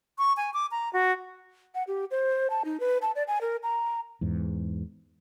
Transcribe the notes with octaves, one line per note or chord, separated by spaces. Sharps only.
C#6
G#5
D6
A#5
F#4
F#5
G4
C5
A5
D#4
B4
A5
D5
G#5
A#4
A#5
E2 G#2